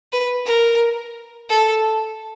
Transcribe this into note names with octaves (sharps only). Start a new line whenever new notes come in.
B4
A#4
A4